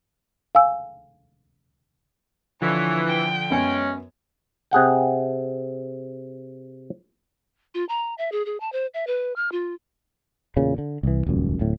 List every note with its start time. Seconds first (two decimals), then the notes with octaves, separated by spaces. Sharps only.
0.55 F5 G#5 E6
2.62 D3 E3 F3 C#5
3.06 G5
3.50 F#2 G#3 B3 C#4 G#5
4.71 C3 G#4 F#5 G5
7.75 F4
7.89 A#5
8.18 E5
8.32 G#4
8.46 G#4
8.60 A5
8.72 C5
8.94 E5
9.07 B4
9.36 F6
9.52 F4
10.56 E2 A#2 C#3
10.78 D3
11.03 C2 E3
11.26 D#1 C#2 F#2
11.59 D1 A2